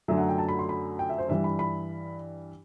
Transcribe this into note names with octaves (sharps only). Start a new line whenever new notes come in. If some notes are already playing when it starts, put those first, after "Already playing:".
F#2 D3 F#3 A3 E5
F#5
G5
A5
B5
C6
B5
G5
E5
C5
G2 E3 G3 E5
B5
B5